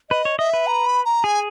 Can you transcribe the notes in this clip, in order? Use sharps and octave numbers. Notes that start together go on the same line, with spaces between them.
B4 D#5
C#5
D#5 E5
B4
A#5
B5
A#5
G#4 G#5